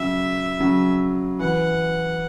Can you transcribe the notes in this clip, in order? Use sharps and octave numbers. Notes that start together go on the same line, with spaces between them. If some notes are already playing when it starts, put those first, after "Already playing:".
Already playing: C#3 F#3 E5
C#3 F#3
E3 F#5